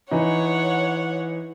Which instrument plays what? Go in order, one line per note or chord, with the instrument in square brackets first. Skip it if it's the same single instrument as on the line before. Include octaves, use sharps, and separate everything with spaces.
[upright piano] E3 D#4 [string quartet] C#5 F#5